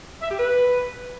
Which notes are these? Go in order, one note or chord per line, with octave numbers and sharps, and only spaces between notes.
E5
G4
B4